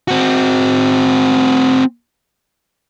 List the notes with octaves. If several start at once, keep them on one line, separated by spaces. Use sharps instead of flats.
C4 F#4